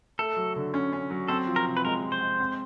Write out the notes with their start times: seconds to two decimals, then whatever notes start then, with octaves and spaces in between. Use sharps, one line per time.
0.19 A3 A4
0.36 F#3
0.56 D3
0.74 C#4
0.93 C#4
1.10 F#3
1.28 C4 A4
1.47 F3
1.56 A#4
1.66 C3
1.77 B4
1.85 G#3 A#4
2.03 F3
2.12 C5
2.21 G#3
2.40 C4